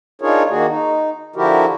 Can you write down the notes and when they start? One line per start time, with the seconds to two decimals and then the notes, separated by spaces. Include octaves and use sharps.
0.21 D4 D#4 F4 G#4 A#4 C#5
0.50 D#3 A#3 F#4 G#4
0.68 D#4
1.36 D3 F3 E4 F#4 G4 A#4